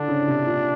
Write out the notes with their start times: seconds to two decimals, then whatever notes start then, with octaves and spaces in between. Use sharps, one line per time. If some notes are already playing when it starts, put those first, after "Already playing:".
Already playing: D3 D4
0.08 C#3
0.27 C3
0.46 A#2